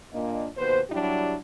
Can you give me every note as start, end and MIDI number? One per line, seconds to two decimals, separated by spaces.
0.13 0.47 46
0.13 0.47 58
0.13 0.47 62
0.13 0.47 75
0.57 0.80 39
0.57 0.80 47
0.57 0.80 71
0.57 0.80 72
0.90 1.35 54
0.90 1.35 55
0.90 1.35 62
0.90 1.35 64
0.90 1.35 67